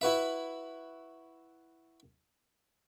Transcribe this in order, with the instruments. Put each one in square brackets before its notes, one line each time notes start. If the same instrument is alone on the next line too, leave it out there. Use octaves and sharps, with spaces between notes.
[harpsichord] E4 F#4 B4 E5